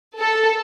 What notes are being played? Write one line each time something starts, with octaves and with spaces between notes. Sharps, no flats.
A4